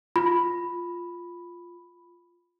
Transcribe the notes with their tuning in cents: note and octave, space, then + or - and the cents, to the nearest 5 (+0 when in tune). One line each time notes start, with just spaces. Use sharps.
F4 +0 B5 +0